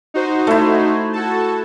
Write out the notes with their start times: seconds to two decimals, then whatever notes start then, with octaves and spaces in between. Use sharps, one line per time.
0.14 D#4 F#4 C5
0.47 A3 E4
1.13 F#4 A4 A5